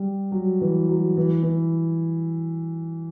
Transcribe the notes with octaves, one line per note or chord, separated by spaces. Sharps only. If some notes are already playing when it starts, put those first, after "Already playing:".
Already playing: G3
F#3
E3
F#3
E3
E3